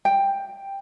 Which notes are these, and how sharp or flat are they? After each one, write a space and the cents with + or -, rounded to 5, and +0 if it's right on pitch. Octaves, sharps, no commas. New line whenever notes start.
G5 +10